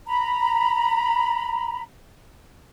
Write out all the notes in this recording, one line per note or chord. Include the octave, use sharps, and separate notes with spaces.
A#5 B5